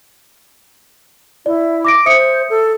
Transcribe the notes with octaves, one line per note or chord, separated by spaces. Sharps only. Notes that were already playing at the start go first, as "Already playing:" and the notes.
E4 D5
D6 A#6 D7
C5 E5 D#6 C#7
A4